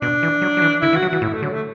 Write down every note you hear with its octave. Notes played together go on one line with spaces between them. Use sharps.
B2 D4
E3
F#3
F#3
E3
D3 E4
E3
F#4
F#3
E3 F#4
A2 E4
A3
D3 F#3
A3